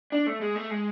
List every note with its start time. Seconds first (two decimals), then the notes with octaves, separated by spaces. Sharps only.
0.12 D4
0.27 A3
0.41 G#3
0.56 A3
0.70 G#3